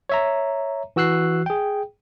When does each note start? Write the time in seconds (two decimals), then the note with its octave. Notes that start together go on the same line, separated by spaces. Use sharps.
0.09 C#5 E5 A#5
0.96 E3 F#4 E6 F#6 C7
1.46 G#4 G5